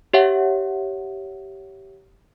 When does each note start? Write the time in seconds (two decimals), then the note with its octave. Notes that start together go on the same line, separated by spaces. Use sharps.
0.14 G4 C#5 E5 F#5